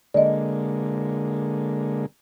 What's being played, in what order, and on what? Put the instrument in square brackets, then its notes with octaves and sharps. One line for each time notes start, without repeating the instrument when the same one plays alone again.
[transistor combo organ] D3 G#3 A#3 [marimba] D5 D#5